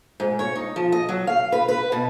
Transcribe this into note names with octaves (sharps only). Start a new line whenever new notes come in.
G#2
C#5
D#4
F3
D#5
F#3
F5
B4
B4
B2